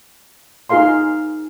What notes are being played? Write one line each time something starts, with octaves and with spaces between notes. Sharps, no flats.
D#4 F4 G#4 A#4 F5 C6